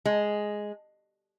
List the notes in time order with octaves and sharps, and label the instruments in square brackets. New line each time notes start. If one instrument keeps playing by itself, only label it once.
[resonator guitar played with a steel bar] G#3